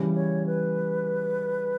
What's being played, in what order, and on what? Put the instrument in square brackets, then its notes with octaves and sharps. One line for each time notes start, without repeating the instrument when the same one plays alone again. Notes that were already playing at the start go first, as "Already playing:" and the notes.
Already playing: [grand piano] C#3 E3 G3
[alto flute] C#5
B4